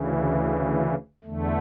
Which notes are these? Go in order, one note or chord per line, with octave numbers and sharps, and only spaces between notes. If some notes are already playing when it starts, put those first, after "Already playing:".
Already playing: D2 C#3 E3
E2 D3 A3